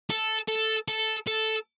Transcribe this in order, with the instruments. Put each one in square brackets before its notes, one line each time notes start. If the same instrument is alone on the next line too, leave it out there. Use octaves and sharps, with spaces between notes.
[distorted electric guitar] A4
A4
A4
A4